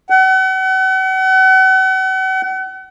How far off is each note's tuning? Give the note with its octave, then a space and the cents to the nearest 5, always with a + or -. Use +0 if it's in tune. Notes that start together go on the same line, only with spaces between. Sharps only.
F#5 +40